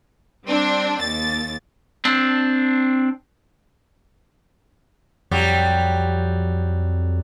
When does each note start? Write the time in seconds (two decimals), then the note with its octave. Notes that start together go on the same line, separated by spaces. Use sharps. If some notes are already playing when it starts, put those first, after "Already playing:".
0.45 G3 C4 D4
0.99 D#2 A6
2.05 C4 D4
5.31 F2 F#3 G3